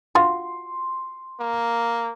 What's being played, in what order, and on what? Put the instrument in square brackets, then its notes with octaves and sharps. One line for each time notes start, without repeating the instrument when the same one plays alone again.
[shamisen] F4 F#4 [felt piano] C6
[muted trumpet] A#3